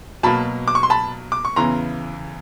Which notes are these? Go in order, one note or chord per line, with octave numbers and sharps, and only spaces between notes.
B2 F#3 A#3 A5 B5
D6
C#6
C6
A5 B5
D6
C#6
E2 C#3 E3 A#5 C6